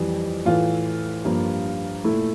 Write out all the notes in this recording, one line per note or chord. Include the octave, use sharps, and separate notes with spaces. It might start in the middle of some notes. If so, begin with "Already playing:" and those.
Already playing: F2 E3 G3
A2 E3 A3 F4
G2 F3 A#3
A#2 A3 E4